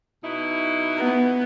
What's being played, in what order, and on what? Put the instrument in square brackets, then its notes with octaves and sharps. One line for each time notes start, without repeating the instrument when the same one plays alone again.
[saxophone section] B2 D#4 E4
[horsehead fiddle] B3